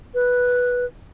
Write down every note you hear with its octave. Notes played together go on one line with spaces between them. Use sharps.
B4